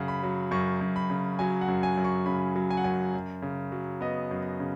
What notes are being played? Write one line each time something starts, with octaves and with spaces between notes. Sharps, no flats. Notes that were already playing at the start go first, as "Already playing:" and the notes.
Already playing: F#2 C#3 F#5
B5
F#3
F#2 C#6
F#2
B5
C#3
F#3 G#5
F#5
F#2
G#5
F#2
C#6
C#3 B5
F#3
G#5
F#5
F#2 G#5
F#2
C#3
F#3
B3 D#5
F#2
C#3